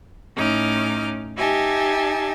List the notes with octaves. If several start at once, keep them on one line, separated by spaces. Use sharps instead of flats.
A2 C#4 D#4 D6 F6
D#4 G4 E5 G#5 A5